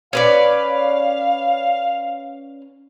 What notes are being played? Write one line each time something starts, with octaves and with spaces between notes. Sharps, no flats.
C#4 B4 D5 F5